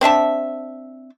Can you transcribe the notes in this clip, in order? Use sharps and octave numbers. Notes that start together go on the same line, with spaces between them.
C4 D4 E5 A5